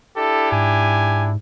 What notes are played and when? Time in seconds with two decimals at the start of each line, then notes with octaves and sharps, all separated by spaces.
0.17 D4 E4 G4 A4
0.52 G#2 G#5